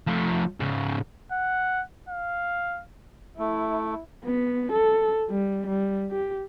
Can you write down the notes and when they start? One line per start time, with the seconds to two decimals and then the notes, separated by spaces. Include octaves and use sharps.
0.07 F3 A3
0.60 G#2 C#3
1.32 F#5
2.09 F5
3.39 A3 E4
4.24 B3
4.72 A4
5.29 G3
5.66 G3
6.11 G4